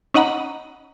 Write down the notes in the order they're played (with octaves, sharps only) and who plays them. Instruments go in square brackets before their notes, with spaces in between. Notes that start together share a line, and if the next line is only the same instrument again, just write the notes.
[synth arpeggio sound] C#4 D#4 D#5 F#5 A#5 B5